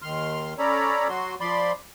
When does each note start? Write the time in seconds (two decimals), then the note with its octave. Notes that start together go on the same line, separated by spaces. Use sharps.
0.02 D#2 D#3 C6 F6
0.58 C#4 A4 C#5 D5 A#5 B5
1.09 F#3 F#4 C6
1.41 F3 D5 B5 C6